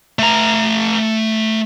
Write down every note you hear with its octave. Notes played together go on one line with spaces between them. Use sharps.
A3 A#5